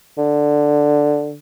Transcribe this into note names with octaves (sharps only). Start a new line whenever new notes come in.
D3